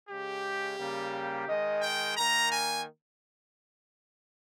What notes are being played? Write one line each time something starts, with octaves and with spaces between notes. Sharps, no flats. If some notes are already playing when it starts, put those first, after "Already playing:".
C#3 G#3 G4
C#3 G3 A#3
D#3 G#3 D#5
G5
D#3 A#3 A#5
G#5